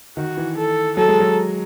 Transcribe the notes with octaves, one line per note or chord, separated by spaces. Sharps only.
D#3 F#4
E3
A4
F#3 A4
G#3
F#3